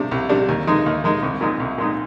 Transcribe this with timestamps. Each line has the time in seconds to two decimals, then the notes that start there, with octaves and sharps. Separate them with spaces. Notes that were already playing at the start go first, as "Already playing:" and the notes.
Already playing: C3 G3 D4
0.11 C2
0.29 C3 G3 D4
0.48 D#2
0.67 D#3 G#3 D#4
0.86 D#2
1.04 D#3 G#3 D#4
1.22 C2
1.41 A#2 G#3 D#4
1.60 C2
1.78 A#2 G#3 D#4